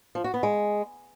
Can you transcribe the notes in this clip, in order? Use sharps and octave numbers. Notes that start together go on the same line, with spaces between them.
F3
F#4
B3
G#3